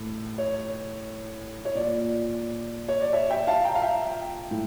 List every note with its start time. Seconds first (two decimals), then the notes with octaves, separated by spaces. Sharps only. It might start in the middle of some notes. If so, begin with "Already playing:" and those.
Already playing: A2
0.38 C#5
1.65 C#5
1.75 A#2 D5
2.88 C#5
3.01 D5
3.13 C#5 E5
3.30 E5 G5
3.47 F5 A5
3.64 G5 A#5
3.75 F5
3.82 E5 G5
4.51 A2